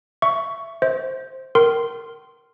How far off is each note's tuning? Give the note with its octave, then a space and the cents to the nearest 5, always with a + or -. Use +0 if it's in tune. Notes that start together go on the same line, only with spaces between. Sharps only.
E5 +15 C#6 +10
C5 +0 E5 -45
A#4 +0 G5 -35 C6 +0